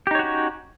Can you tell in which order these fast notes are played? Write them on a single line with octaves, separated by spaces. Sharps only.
G4 D#4 C#5 F#4 C#4